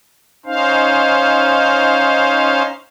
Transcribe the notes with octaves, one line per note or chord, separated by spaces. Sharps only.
C#4 D#4 C5 F5